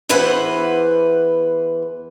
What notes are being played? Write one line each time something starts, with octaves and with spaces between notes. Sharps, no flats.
E2 E3 B4 C5 F#5